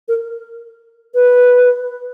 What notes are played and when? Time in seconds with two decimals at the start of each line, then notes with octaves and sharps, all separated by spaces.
0.08 A#4
1.14 B4